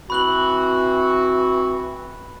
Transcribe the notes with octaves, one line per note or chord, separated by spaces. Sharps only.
E3 C4 F#4 B5 F#6 F#7